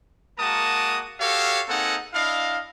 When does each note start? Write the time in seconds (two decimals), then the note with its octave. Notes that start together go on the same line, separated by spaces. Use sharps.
0.38 G#3 A#3 F#4 A#4 A5 D#6
1.20 F#4 G4 A4 C#5 F5
1.68 A#3 C4 D#4 G#4 A4 F#5
2.13 D4 E4 D#5 F5